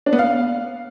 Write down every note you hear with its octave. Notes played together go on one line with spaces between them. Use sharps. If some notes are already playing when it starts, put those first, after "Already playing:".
D4
B3
F5